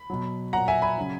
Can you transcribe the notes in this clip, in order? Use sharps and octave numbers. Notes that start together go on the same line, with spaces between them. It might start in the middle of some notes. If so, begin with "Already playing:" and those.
Already playing: B5
B2 F#3
A#2 F#3 F#5 A#5
E5 G#5
G#5 B5
C#3 F#3